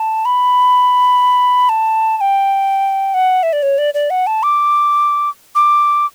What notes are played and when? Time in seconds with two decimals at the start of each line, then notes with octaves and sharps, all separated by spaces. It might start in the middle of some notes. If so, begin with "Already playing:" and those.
Already playing: A5
0.25 B5
1.69 A5
2.17 A5
2.21 G5
3.14 F#5
3.43 E5
3.53 D5
3.63 C#5
3.78 D5
3.94 D5
4.10 F#5
4.27 A5
4.43 D6
5.55 D6